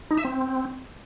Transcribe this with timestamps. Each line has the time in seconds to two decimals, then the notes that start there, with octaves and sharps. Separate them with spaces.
0.11 D#4
0.18 E5
0.25 C4